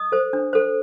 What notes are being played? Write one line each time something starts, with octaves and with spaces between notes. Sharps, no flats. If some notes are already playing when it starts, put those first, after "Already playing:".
Already playing: D#5 D#6
A4 C5
D4
A4 C5